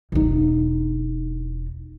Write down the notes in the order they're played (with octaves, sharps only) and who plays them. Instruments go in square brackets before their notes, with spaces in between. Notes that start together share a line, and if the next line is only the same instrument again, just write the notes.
[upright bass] E1 D#4